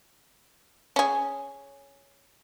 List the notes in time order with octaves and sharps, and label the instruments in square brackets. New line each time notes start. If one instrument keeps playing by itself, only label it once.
[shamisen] C#4 G#4